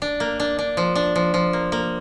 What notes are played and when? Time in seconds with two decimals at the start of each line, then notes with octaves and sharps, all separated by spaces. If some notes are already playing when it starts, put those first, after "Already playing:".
0.02 D4
0.20 A#3
0.40 D4
0.59 D4
0.77 F3
0.95 D4
1.16 F3
1.34 F3
1.53 A#3
1.72 A#3